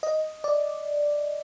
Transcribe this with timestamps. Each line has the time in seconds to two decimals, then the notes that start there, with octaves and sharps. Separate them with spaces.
0.03 D#5
0.44 D5